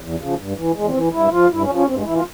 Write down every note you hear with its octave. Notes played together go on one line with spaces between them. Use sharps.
E2
C#3 F3
G2
E3
E2 G#3
C4
E3
G2 E4
F3 F4
G2 E4
C#4
F3
C#4
G2 C4
G#3
E3 E4
F4